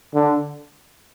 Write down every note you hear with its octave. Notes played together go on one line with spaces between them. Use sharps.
D3